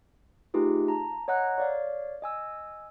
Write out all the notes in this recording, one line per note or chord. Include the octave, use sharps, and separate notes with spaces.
A3 D#4 F4 G4 G#4 B4
A5 A#5
C#5 D#5 F#5 A#5 F#6
C#5 D5 F5
D#5 G#5 E6